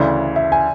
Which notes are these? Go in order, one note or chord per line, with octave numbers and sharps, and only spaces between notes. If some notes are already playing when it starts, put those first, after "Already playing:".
Already playing: D2 C#3 E3 D5
E5
G#5